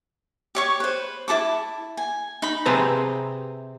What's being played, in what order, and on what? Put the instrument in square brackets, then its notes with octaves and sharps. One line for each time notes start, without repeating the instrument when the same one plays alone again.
[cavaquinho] G4 C#5 C#6
B4 C5
E4 A4 A5 D6
G#5
D#4 B5
[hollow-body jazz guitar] C3 C4 G#4 B4 A5 A#5